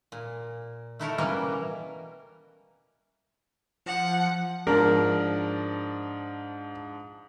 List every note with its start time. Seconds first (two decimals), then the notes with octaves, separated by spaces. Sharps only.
0.12 A#2
0.99 A3 D#4 E4 F#4 A4 A#4
1.18 B2 E3 G3 A#3 C#4 A#4
3.86 F3 F#5
4.67 G#2 F3 D4 A#4